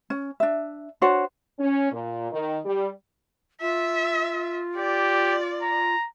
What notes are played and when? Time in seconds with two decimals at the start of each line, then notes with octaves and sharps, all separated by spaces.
0.10 C#4
0.40 D4 E5
1.02 D4 F#4 C5 C#5
1.59 C#4
1.91 A#2
2.31 D#3
2.64 G3
3.61 F4 E5
4.77 G4 D5
5.62 A#5